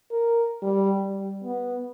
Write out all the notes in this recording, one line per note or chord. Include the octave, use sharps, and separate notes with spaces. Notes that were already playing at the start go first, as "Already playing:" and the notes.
A#4
G3
G3
B3